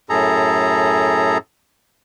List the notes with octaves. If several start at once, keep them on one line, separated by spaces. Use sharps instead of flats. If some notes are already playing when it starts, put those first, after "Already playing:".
F#2 A2 G#4 A4 A#5